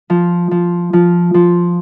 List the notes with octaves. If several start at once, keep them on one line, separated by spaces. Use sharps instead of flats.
F3
F3
F3
F3